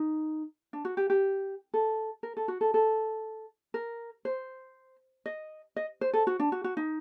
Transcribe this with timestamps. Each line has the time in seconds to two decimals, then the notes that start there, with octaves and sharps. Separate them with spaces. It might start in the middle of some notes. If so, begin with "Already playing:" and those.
Already playing: D#4
0.73 D4
0.85 F#4
0.97 G4
1.10 G4
1.74 A4
2.23 A#4
2.37 A4
2.48 F#4
2.61 A4
2.74 A4
3.74 A#4
4.25 C5
5.26 D#5
5.76 D#5
6.01 C5
6.13 A4
6.27 F#4
6.40 D4
6.52 F#4
6.64 F#4
6.77 D#4